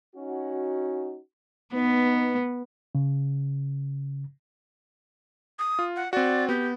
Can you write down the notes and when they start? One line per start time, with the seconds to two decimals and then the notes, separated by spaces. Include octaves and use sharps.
0.16 C#4 D#4 F#4
1.74 B3 D#4 B4
2.95 C#3
5.59 D#6
5.79 F4
5.96 F#5
6.13 C4 F#4 D5
6.49 B3 G4